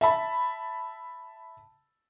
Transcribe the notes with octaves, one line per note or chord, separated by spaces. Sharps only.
E5 A5 B5